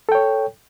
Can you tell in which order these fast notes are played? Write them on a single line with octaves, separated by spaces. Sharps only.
A4 G5 C#5